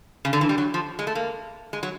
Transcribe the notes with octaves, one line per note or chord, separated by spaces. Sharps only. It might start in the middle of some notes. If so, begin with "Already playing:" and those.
C#3
D3
E3
G3
F#3
F3
G#3
A3
A#3
G#3
F#3